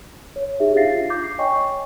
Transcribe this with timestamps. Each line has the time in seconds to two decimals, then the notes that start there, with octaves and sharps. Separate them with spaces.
0.36 C#5
0.60 D#4 G4 G#4 E5
0.76 D4 F4 F5 A6 A#6 C7
1.10 D6 G6
1.24 C7
1.38 C#5 D#5 G5 G#5 C#6